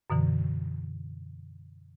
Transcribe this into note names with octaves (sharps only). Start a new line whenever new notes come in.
F#2 B2 D3 E3